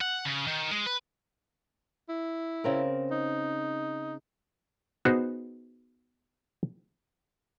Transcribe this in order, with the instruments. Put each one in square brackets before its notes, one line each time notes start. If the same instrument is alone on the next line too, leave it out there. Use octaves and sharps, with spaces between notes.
[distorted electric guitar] F#5
C#3
D#3
G#3
B4
[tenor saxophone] E4
[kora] C#3 C4 A#4
[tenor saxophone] D#4
[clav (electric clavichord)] B3 D#4 F#4 G#4 C5